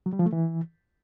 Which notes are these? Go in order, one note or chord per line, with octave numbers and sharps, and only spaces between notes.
F#3
G3
F3
A3
E3